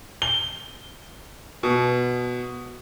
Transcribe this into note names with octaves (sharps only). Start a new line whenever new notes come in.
G7
B2